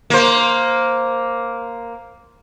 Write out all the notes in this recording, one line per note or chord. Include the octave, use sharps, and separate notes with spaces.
A#3 C5